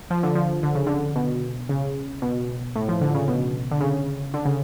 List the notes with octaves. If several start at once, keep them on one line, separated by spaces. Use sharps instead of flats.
F3
D3
F3
D3
C#3
D3
B2
C#3
B2
A2
F3
D3
C#3
B2
D3
C#3
D3
C#3